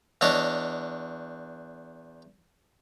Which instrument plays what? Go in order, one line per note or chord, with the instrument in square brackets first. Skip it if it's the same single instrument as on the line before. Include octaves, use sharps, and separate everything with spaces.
[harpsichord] E2 D4 C#5 D#5